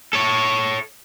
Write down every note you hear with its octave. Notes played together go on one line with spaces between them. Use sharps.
A4 C#5